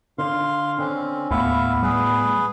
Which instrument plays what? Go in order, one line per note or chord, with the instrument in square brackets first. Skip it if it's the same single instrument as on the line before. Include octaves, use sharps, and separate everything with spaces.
[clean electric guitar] D3 [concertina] F5 C6
[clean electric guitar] D3 [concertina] C4 C#4
[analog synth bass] D#2 [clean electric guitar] A2 B3 [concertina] E5 F5
[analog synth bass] G3 [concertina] G#4 B4